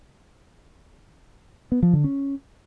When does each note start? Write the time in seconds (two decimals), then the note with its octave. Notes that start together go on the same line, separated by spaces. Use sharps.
1.72 B3
1.83 F3
1.93 D3
2.04 C#4